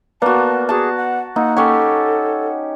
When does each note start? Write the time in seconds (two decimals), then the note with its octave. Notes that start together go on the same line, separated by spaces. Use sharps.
0.22 A#3 B3 F#4 B4 D5 A5
0.69 F#4 G#4 A5
0.96 F#5
1.36 A#3 D#4 F#5
1.57 C#4 G4 A4 C#5 F#5